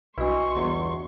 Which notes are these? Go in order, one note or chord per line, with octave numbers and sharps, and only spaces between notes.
B1 D4 E4 F#4 B4 D#5 C6 C#6
G1 E2